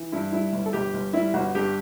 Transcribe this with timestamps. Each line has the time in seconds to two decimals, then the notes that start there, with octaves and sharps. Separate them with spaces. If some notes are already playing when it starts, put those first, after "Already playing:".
Already playing: E3
0.12 G2 E4
0.33 G3 E4
0.53 G1
0.66 A4
0.73 G1 G4
0.94 G1
1.13 G3 E4
1.34 G1 F#4
1.55 G2 G4